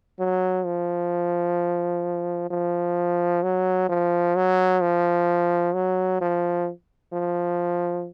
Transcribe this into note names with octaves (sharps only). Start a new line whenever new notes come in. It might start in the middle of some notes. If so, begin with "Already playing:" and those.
F#3
F3
F3
F#3
F3
F#3
F3
F#3
F3
F3